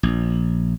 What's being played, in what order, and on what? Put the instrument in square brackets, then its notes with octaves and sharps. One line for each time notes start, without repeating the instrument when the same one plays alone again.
[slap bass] A#1